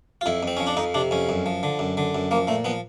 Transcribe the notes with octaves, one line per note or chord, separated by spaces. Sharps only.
F4
F2 E4
F2 C4
F3 C#4
D4
F2 D#4
C3 D4
F2 C#4
F#2
F3
D3
F#2
D3
F#2
F3 A#3
A#2 A3
F3 B3